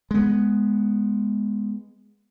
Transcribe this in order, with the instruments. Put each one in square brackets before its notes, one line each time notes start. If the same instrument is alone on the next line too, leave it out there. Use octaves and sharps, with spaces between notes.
[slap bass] G#3 B3